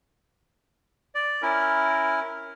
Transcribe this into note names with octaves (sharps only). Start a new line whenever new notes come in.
D5
C#4 E4 A#4